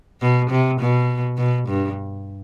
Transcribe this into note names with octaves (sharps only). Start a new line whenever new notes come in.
B2
C3
B2
B2
G2